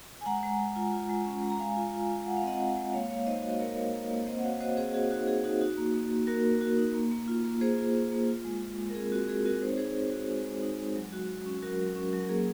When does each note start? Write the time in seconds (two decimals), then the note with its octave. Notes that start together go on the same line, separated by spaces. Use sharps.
0.21 G#5
0.26 G#3 F#5 A#5
0.43 G#3
0.59 G#3
0.76 F4
0.93 F4
1.09 G#3
1.26 C#4
1.43 G#3
1.50 A#5
1.60 G#3 F5 G#5
1.76 F4
1.93 F4
2.10 F4
2.26 G#3 F#5
2.37 F5
2.43 C4 D#5 F#5
2.60 G#3
2.76 G#3
2.93 A#3 C#5 F5
3.10 A#3 C#5 F5
3.27 D#4 C5 D#5
3.43 F#4 D#5
3.60 A#3 A#4 C#5
3.77 A#3
3.94 A#3
4.10 A#3
4.27 C4 C5 D#5
4.38 F#5
4.44 F#4 C#5 F5
4.61 F#4 C5 D#5
4.77 C4 G#4 C5
4.94 F#4 G#4
5.11 D#4 F#4
5.28 F#4 G#4
5.44 D#4 F#4
5.61 D#4 F#4
5.78 A#3
5.95 A#3
6.11 A#3
6.27 A#3 F#4 A#4
6.45 A#3
6.61 F#4
6.78 D#4
6.95 A#3
7.11 A#3
7.28 F4
7.44 A#3
7.61 A#3 G#4 C5
7.78 F4
7.95 A#3
8.12 A#3
8.28 F4
8.45 G#3
8.62 G#3
8.78 G#3
8.90 A#4
8.95 C4 G#4
9.12 C4 F#4
9.28 G#3 G#4
9.45 C4 F#4 A#4
9.62 D#4 C5
9.70 C#5
9.77 D#4 G#4 C5
9.96 D#4
10.12 F#4
10.29 G#3
10.46 G#3
10.62 D#4
10.79 G#3
10.96 F#3
11.12 F#4
11.29 F#4
11.46 C#4
11.62 F#3 F#4 A#4
11.79 F#3
11.96 C#4
12.13 F#3
12.18 A#4
12.29 A#3 G#4